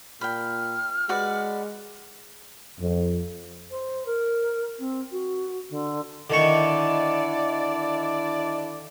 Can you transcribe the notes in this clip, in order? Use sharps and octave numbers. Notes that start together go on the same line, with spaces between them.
A#2 G5 B5 F6
G#3 F#4 B4 D5
F2
C5
A#4
C4
F#4
D3
D3 D#3 D4 E4 D5 C#6